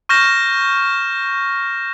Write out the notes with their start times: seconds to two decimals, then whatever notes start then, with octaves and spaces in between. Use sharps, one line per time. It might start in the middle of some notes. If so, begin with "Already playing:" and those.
0.09 C#6 F6 G6 A#6 E7